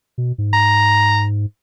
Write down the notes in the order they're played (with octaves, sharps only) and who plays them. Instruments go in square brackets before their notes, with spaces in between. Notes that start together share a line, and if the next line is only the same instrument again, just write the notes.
[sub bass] B2
G#2
[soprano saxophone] A#5